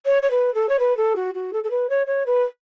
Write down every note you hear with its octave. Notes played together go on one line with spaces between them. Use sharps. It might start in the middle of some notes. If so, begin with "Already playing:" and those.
C#5
C#5
B4
A4
C#5
B4
A4
F#4
F#4
A4
A4
B4
C#5
C#5
B4